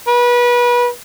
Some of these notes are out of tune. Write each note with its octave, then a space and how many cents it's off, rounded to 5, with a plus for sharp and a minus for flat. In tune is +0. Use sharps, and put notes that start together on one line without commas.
B4 -30